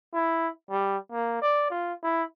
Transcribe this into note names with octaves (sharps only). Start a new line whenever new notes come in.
E4
G3
A#3
D5
F4
E4